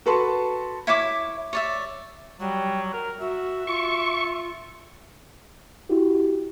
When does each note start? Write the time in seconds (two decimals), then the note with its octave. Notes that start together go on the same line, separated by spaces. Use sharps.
0.06 F#4 A4 B4 A5 C6 C#6
0.87 E4 C#5 E5 D6
1.53 C#5 D5 E5
2.39 F#3 G3
2.93 A#4
3.20 F#4 E5
3.67 F4 C#6
5.89 E4 F#4 G4